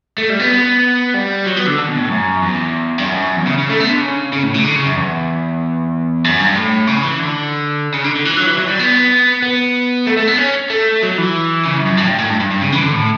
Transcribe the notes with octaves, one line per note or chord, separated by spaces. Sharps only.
A3
G3
B3
G3
F#3
B3
D3
D3
B2
A2
F#2
E2
G2
F#2
E2
C#3
C#3
A3
B3
D3
C#3
C#3
A2
C#3
D3
C#3
F#2
E2
F#2
G2
A2
C#3
E3
D3
C#3
D3
D3
E3
F#3
E3
F#3
G3
B3
B3
A3
A3
B3
C#4
A3
F#3
E3
C#3
F#2
F#2
A2
G2
A2
G2
G2
G2
C#3
E3
D3
A2